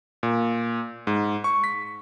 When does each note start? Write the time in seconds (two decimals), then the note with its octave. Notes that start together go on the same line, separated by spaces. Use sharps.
0.23 A#2
1.07 G#2
1.44 C#6
1.64 B6